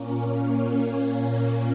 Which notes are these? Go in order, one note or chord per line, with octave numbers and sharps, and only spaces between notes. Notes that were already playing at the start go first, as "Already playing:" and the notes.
Already playing: A#2 A#3 C#4
C#4
A#2 A#3 C#4